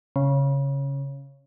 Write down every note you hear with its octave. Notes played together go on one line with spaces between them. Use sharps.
C#3